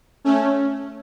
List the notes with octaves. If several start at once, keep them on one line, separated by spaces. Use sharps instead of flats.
A3 C#4